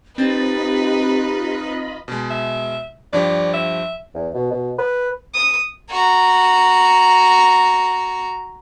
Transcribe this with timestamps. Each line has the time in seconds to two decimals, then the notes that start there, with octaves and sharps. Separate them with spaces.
0.18 C4 D#4 F4 G4 B4 D#5 B5 A6
2.08 B2 G#3
2.30 E5
3.13 G2 F3 G4 D5
3.54 E5
4.14 E2
4.34 B2
4.51 B2
4.78 B4
5.34 D#6
5.91 F#4 A#5